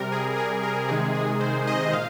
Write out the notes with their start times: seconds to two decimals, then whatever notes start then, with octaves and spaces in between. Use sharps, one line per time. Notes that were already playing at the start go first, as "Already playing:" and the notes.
Already playing: C3 G3 A#4
0.12 G#4
0.38 G#4
0.63 A#4
0.89 C3 D#3 G#3 G#4
1.15 G#4
1.40 C5
1.67 D#5
1.93 A#2 F5